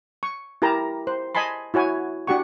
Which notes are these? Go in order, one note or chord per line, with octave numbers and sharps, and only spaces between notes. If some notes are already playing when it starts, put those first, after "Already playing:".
C#6
E4 G4 A#4 A5 A#5
C5
D#5 G#5 A5 B5 C6
E4 F#4 C#5 G#5
D4 F#4 G4 F#5 C#6